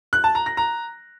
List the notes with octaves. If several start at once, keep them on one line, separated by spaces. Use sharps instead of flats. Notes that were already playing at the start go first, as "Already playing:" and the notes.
F#6
A5
A#5
A#6
A#5